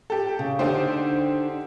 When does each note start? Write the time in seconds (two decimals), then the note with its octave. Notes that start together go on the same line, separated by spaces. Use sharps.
0.10 G4 A4
0.39 C#3
0.59 D3 D4 D#4 G4 C5